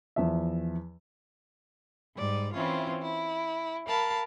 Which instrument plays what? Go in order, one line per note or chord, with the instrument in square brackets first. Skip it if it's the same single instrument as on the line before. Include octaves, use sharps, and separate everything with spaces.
[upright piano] E2 F3 E5
[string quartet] G#2 G3 D5
E3 C4 C#4 E4 F4
E4
A#4 F5 A5 B5